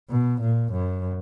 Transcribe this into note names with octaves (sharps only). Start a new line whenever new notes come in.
B2
A#2
F#2